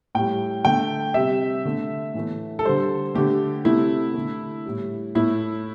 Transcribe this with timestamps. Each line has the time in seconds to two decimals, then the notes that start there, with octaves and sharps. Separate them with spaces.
0.15 A2 G3 G5
0.65 D3 A3 G5
1.14 C3 G3 E5
1.65 D3 A3
2.14 A2 E3 A3
2.59 A4
2.64 D3 G3 C5
3.15 D3 A3 G4
3.65 C3 A3 E4
4.14 D3 A3
4.66 A2 G3
5.15 A2 A3 E4